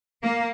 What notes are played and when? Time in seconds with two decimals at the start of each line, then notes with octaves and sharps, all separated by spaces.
0.23 A#3